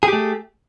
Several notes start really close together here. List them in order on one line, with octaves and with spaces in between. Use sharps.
G#4 G4 A3